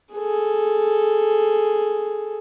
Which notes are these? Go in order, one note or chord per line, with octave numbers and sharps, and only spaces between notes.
G#4 A4